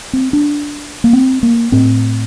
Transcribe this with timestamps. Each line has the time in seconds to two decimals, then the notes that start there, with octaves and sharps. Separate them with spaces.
0.13 C4
0.33 D4
1.04 A#3
1.13 C4
1.43 A#3
1.72 A2 C4